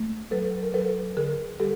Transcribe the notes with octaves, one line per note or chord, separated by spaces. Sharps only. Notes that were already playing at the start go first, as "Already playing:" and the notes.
Already playing: A3
F#3 A4 B4
A#4
F#3 A4 B4
D3 G#4 A#4
G3 G4 A4